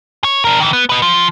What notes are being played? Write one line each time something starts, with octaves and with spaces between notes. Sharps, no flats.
C#5
D4 A#4
D#3 E3
B3
B4 D#5
F3